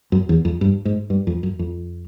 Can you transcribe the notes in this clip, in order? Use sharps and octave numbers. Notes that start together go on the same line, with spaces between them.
F#2
E2
F2
G2
G#2
G2
F2
F#2
F2